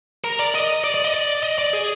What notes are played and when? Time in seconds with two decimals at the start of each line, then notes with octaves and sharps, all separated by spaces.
0.24 A#4
0.39 D5
0.55 D#5
0.84 D5
0.94 D5
1.05 D#5
1.14 D5
1.43 D#5
1.58 D5
1.73 G#4